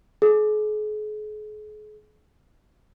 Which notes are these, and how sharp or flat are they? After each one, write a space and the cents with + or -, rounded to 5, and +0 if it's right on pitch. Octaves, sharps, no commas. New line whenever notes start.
G#4 +40